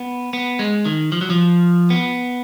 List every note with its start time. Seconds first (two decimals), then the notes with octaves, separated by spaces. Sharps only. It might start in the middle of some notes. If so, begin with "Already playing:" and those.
Already playing: B3
0.33 B3
0.59 G#3
0.85 D#3
1.12 F3
1.21 F#3
1.30 F3
1.90 B3